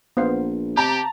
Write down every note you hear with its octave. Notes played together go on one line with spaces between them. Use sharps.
A#1 B3 C5 F5
C3 G4 A5 A#5